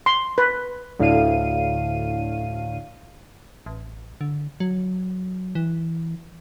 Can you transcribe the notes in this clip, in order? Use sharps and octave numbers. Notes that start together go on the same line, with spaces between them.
C6
B4
D2 A2 F5 D#7
A1
D3
F#3
E3